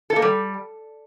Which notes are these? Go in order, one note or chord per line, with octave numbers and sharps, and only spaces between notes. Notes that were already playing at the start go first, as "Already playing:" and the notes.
A4
A#3
G3